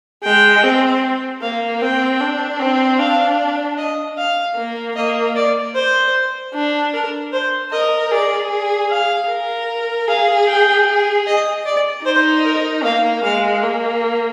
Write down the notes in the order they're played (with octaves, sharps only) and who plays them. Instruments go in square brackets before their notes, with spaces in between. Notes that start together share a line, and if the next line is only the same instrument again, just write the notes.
[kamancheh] G#3 [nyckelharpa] G5
[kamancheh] C4
[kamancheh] A#3 [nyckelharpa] F5
[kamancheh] C4 [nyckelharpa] G5
[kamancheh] D4
C4
[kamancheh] D4 [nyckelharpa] F5
[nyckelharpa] D#5
F5
[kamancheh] A#3
[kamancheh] A#3 [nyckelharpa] D#5
[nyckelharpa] D5
C5
[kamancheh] D4
[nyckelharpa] A#4
C5
[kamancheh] A#4 [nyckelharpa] D#5
[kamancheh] G#4 [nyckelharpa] D5
[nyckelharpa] F5
[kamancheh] A#4
[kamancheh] G#4 [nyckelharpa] F5
[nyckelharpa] G5
[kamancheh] G#4
[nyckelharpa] D#5
D5
[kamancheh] D#4 [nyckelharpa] C5
[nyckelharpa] A#4
[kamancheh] A#3 [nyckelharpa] F5
[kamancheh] G#3 [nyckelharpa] F5
[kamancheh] A#3